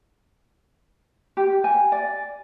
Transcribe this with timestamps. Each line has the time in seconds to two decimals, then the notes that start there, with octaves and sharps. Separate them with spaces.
1.37 G4
1.64 G#5
1.92 D5